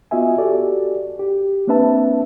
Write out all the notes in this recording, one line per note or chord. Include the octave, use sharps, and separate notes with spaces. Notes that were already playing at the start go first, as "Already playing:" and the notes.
B3 F4 F#4 D#5 E5 G#5
F#4 G4 A4 D5
G4
A#3 C4 D4 B4 E5 A5